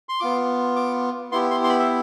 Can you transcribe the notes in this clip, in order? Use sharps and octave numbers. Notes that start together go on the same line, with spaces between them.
C6
B3 F4 D6
D6
B3 E4 G4 C6
C6
C6
B5
E5